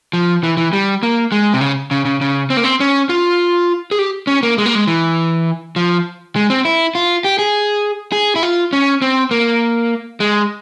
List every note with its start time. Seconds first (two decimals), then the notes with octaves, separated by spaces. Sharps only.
0.13 F3
0.43 E3
0.57 E3
0.73 G3
1.03 A#3
1.32 G#3
1.53 C3
1.61 C#3
1.91 C#3
2.05 C#3
2.21 C#3
2.50 C4
2.57 A#3
2.64 C4
2.80 C#4
3.09 F4
3.91 G#4
3.99 G4
4.27 C#4
4.43 A#3
4.58 G#3
4.66 A#3
4.75 G#3
4.87 E3
5.76 F3
6.36 G#3
6.50 C4
6.65 E4
6.95 F4
7.24 G4
7.39 G#4
8.12 G#4
8.36 E4
8.43 F4
8.73 C#4
9.02 C4
9.31 A#3
10.20 G#3